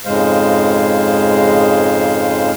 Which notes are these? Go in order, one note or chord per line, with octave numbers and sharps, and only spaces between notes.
F2 G#2 C#3 G#3 C5 F5